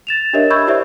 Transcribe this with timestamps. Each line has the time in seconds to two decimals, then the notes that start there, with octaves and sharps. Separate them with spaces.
0.07 A6 E7 F7
0.33 D4 G4 A#4 C#5 D#5 E5
0.50 B5 C#6 E6 G6 G#6
0.67 E4 G4 C5 D5 E5